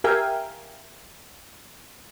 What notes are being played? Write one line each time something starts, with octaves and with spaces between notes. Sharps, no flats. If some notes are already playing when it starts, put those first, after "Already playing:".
G4 A#4 E5 F5 G5 G#5